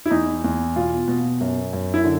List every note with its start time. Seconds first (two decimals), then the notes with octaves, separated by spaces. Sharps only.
0.06 E4
0.11 E2 D#4
0.44 E2
0.76 B2 F4
1.08 B2
1.41 F#2
1.73 F#2
1.94 E4
2.04 D3